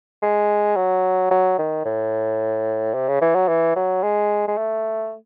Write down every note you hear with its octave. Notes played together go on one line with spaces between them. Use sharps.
G#3
F#3
F#3
D#3
A2
C3
C#3
E3
F#3
E3
F#3
G#3
G#3
A3